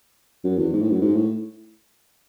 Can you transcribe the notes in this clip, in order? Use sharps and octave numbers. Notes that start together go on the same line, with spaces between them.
F#2
E2
G#2
A2
F#2
G#2
A2